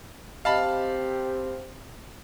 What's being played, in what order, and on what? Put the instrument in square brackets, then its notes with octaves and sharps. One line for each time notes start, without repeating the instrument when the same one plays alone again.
[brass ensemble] C4 [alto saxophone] G4 [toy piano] D#5 [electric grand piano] F5 A5 B5